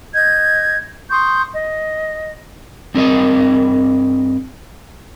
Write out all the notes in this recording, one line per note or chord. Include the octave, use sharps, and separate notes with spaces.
D#5 G6 G#6
C6 C#6 D#6 G6
D#5
G2 C4 G#4 A#4 D#5